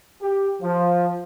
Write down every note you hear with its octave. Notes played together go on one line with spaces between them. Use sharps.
G4
F3